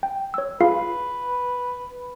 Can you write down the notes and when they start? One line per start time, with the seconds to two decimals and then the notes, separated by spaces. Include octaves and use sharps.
0.03 G5
0.34 C#5 E6
0.61 F4 G#4 B4 F5